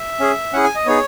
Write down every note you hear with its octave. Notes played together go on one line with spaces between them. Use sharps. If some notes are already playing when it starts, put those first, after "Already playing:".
Already playing: E5
C#4 G#4
C#4 E4 G#4 F#5
G#5
D#5
B3 D#4 G#4 C#5